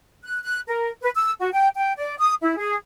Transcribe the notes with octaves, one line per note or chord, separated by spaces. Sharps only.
F#6
F#6
A#4
B4
E6
F#4
G5
G5
D5
D#6
E4
G#4